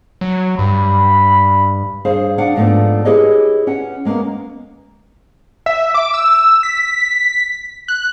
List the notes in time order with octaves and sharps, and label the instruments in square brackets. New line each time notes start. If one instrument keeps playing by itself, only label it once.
[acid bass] F#3
[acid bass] G2 [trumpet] B5
[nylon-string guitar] G2 G#4 C5 C#5 F5
D4 F5 F#5
G#2 F3 A3 B3 D4
E4 G4 G#4 B4 C#5 D#5
C#4 B4 F#5
G#3 A#3 B3 C#4
[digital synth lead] E5
D6
E6
B6
F#6